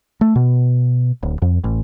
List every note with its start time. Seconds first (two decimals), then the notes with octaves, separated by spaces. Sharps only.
0.21 A3
0.36 B2
1.23 D1
1.42 F2
1.64 A1